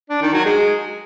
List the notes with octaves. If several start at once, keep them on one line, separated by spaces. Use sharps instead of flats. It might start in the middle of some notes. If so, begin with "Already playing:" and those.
D4
D#3
F#3
G#3